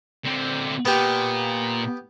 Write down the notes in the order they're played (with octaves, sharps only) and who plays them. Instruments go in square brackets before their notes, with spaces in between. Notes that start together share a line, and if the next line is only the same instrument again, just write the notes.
[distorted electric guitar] D3 C4
[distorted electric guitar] A#2 [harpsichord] B3 G4